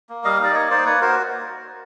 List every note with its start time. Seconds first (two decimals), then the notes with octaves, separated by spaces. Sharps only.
0.09 A#3
0.24 G3 D#5 F5
0.39 D#4 D5
0.54 A#3 C#5 D#5
0.70 D#4 C5 D5
0.85 A#3 B4 C#5
1.01 F#4 A#4 C5